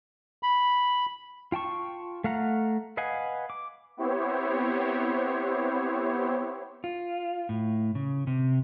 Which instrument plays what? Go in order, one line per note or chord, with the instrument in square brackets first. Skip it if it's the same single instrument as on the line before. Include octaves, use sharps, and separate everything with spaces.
[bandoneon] B5
[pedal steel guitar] F4 G5 A5 C#6
A3 F5 F#5 A#5
B4 D#5 F5 F#5 G#5
D6
[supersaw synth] B3 C4 E4 G4 C5 C#5
[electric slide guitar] F4
A2
C#3
C3